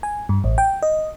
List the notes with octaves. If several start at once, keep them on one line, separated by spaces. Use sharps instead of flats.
G#5
G2
A1
G5
D#5